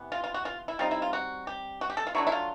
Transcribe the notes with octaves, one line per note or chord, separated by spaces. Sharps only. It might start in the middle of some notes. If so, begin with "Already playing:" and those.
Already playing: C3 E3 B3
F4
F4
F#4
F4
E4
G3 C4 D#4 F4
E4
F4
F#4
G4
F#4
G4
A4
F4
F#3 A3 D4 E4
E4
F4